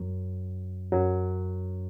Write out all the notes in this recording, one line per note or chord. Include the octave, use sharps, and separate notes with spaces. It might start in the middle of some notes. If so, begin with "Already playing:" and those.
Already playing: F#2 F#3
F#2 F#3